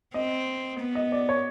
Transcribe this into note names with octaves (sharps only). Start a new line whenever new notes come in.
C4 D#5
B3
D#5
D5
C#5